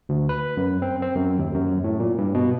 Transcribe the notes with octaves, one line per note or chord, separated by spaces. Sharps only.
D2
B4
F#2
C4
C4
F#2
D#2
F#2
A2
A#2
G2
B2